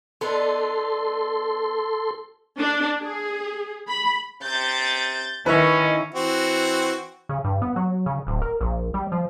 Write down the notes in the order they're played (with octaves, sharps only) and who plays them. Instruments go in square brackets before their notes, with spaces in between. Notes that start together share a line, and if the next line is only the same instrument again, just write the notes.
[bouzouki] B3 D4 D#4 [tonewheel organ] A4 C6
[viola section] D4
G#4
B5
[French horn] C3 [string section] G6 A6
[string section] D#3 [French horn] C#4 [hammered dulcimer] E4 C#5 [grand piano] B4 E5
[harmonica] E3 C4 F#4
[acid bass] C#3
G2
B3
F#3
C#3
D1
A#4
A#1
G3
F3